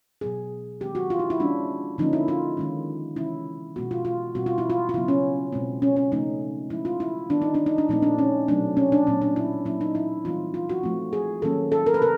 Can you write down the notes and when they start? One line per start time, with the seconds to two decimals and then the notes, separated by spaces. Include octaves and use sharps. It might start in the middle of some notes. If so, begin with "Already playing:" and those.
0.21 B2 F#3 B3 G#4
0.81 D#3 G#3 C4 G4
0.95 F#4
1.10 F4
1.19 E4
1.30 E4
1.40 F3 G#3 C#4 D4
1.98 D3 F3 A#3 C#4 D#4
2.13 E4
2.28 F4
2.57 D#3 G#3 C#4
3.16 C3 E3 G#3 C#4 E4
3.76 B2 G#3 B3 F#4
3.91 F4
4.05 F4
4.35 B2 G3 C4 F#4
4.46 F4
4.58 E4
4.70 F4
4.89 F4
4.94 C#3 F#3 B3 E4
5.08 C#4
5.52 B2 G#3 C4
5.82 C#4
5.96 C#4
6.12 C#3 F3 A3 C#4 D#4
6.70 F3 G#3 C#4 E4
6.85 F4
7.00 E4
7.30 D#3 G3 B3 D4
7.42 D#4
7.54 D4
7.66 D#4
7.78 D4
7.89 A#2 F3 A3 C4 D#4
8.02 D4
8.18 C#4
8.48 B2 F#3 A3 C4 D4
8.77 C#4
8.92 D4
9.07 A#2 F#3 B3 C#4
9.21 D4
9.36 E4
9.65 A#2 F#3 A#3 C#4 E4
9.81 D#4
9.95 E4
10.25 E3 G3 C4 F4
10.54 F4
10.69 F#4
10.83 F3 A3 C4
11.13 G#4
11.42 D#3 F#3 A#3 C#4 A4
11.72 A4
11.86 A#4
11.94 B4
12.01 C3 A#4